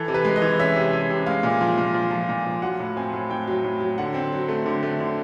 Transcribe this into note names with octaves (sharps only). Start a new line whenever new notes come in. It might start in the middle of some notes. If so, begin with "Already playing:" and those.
Already playing: E3 A4
C3
B4
G#3
D#5
E3
C#4 E5
C3
C3
C3
G#3 F5
A#2
F3
A#2
F3
F3
A#2
F3
F#3 F#5
A2
C4 G#5
A2
A2 G5
F#3
A2
F#3
D3 F#5
C4
F#3
A3
D3
A3
D3